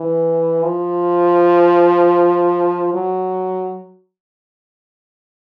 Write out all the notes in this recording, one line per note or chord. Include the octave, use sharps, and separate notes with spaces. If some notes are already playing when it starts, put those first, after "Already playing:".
Already playing: E3
F3
F#3